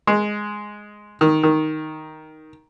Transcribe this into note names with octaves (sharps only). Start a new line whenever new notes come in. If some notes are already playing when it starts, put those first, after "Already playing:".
G#3
D#3
D#3